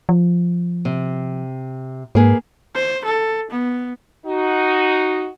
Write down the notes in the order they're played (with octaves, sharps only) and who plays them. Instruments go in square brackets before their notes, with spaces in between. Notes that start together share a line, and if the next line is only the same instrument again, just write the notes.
[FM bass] F3
[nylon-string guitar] C3
[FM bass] G#2 [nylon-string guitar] A#3 G#4 B4
[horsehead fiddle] C5
A4
B3
[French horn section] D#4 F#4